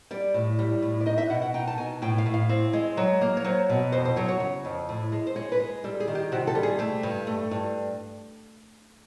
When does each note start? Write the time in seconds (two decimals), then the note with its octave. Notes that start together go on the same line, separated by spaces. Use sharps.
0.11 G3 D5
0.34 A2
0.59 G3
0.82 A2
1.01 D5
1.06 D#4 D#5
1.18 E5
1.30 B2 F#5
1.42 F#5
1.54 D#4 G5
1.67 A5
1.78 B2 G#5
2.02 A2 G5
2.18 F5
2.26 A2
2.34 F5
2.49 C4
2.73 G#3
2.97 F#3
3.21 A#3
3.37 C#5
3.44 F#3 C5
3.70 B2
3.92 F2 C5
4.05 C5
4.16 F#3 C#5
4.28 C#5
4.40 C#3
4.65 F2
4.89 A2
5.12 G#3
5.27 C5
5.36 G#3 C#5
5.52 B4
5.60 G#3
5.84 G3 A4
6.00 G#4
6.07 D#3
6.15 G4
6.32 C3 F#4
6.47 A4
6.55 G3
6.63 G#4
6.79 A3 G4
7.03 G2
7.27 A3
7.51 G2